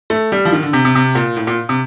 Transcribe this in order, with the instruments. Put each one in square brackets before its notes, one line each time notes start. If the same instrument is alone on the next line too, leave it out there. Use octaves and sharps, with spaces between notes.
[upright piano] A3
G3
F3
D#3
D3
C3
C3
C3
A#2
A2
A#2
C3